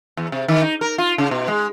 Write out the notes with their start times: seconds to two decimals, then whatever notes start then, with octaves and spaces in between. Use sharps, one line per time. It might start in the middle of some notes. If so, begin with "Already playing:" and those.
0.17 E2
0.32 C3
0.48 D#3
0.62 D#4
0.81 A#4
0.98 F4
1.18 C#3
1.31 B2
1.48 G#3